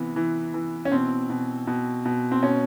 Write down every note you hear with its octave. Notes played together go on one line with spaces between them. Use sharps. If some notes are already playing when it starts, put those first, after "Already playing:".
Already playing: C3 E3 B3
E3
E3
C#4
B2 C4
B2
B2
B2
C4
B2 C#4